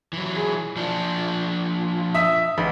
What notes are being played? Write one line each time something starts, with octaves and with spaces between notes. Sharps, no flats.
E3 F#3
G#4
F3 D4
E5 D#6 B6
A1